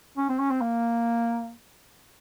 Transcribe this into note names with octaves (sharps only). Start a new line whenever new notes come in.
C#4
C4
C#4
C4
A#3